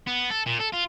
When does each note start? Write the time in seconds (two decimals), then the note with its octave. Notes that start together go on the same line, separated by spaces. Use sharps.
0.07 B3
0.30 A4
0.46 A#2
0.59 A4
0.72 F4